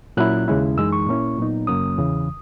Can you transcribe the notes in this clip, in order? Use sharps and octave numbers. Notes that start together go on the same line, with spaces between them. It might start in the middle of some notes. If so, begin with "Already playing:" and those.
A#2 F#3 C#4 E4 F#6
D#2 C#3 G#3 C#4 E4
F#2 E3 G#3 D#4 E6
C#6
A#2 A#3 C#4 E4
A#2 F#3 B3 D#4
F#2 C#3 F#3 A#3 C#4 D#6
E2 C#3 E3